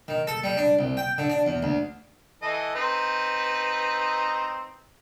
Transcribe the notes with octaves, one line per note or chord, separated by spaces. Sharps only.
D#3
A4
G3
D4
C2
G5
D3
D4
E2
D2
E3 A4 D#5
C4 D#4 B4